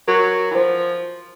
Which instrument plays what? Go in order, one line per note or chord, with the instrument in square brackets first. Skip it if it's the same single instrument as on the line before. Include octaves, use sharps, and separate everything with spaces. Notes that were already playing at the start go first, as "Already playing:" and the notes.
[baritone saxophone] F#3 [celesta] A#4
[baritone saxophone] E3
[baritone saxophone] F3 [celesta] C5